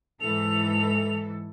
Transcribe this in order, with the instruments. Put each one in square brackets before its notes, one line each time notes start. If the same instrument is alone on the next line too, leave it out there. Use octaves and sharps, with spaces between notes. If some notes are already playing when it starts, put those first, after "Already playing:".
[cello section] G#2 E3 A4 [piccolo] F7